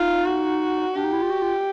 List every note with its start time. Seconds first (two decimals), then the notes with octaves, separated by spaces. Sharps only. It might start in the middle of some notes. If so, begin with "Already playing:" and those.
Already playing: D#4 F4
0.26 F#4
0.95 D4 G4
1.04 D#4
1.13 E4
1.22 F4
1.30 F#4
1.42 F4